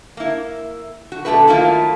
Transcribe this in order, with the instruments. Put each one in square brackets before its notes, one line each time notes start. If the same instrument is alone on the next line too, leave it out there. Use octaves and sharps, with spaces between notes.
[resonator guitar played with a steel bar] A#3 E4
F#4
B2 D3 G#3 A3 F#4 B4
D#3 F#3 A3 A#3 E4 F4